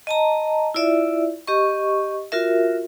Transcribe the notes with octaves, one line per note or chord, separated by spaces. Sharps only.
D#5 A5 A#5
E4 F4 D5 E5
G4 D#5 C#6
F4 F#4 A#4 E5